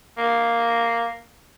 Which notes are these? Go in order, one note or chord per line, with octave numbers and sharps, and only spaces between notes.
A#3